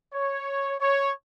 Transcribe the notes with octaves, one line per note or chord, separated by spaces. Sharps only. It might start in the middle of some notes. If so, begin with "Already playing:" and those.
C#5
C#5